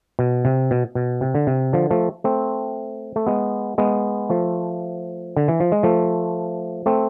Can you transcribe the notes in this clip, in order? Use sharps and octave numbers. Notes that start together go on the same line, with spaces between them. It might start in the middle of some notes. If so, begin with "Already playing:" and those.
B2
C3
B2
B2
C3
D3
C3
D3 F3
F3 A3
A3 C4
A3
G#3 B3
G#3 B3
F3 A3
D3
E3
F3
G#3
F3 A3
A3 C4